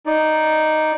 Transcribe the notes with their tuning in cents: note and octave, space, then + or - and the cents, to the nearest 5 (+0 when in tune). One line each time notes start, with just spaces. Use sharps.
D#4 +0 D5 +0